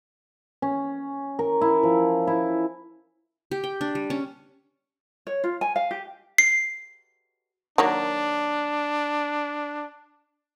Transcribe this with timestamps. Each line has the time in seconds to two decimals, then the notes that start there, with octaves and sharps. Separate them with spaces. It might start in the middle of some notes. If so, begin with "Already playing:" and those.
0.62 C#4
1.39 A#4
1.61 E4
1.83 F3
2.27 E4
3.51 G4
3.64 G5
3.81 D4
3.95 G3
4.10 C#4
5.27 C#5
5.44 F4
5.61 G#5
5.76 F5
5.91 G4
6.38 C7
7.78 D#3 F#3 A#3 D4